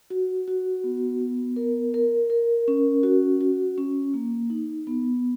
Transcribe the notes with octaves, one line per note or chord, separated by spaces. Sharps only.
F#4
F#4
B3
B3
A#4
A#4
A#4
C#4
F#4
F#4
C#4
A#3
D#4
B3